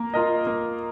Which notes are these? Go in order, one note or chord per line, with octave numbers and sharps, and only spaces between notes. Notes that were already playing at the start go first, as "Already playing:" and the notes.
Already playing: A#3 A#4
F4 A#4 D#5
A#3